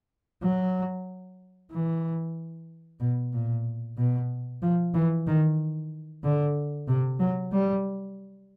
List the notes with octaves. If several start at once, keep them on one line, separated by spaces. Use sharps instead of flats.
F#3
E3
B2
A#2
B2
F3
E3
D#3
D3
C3
F#3
G3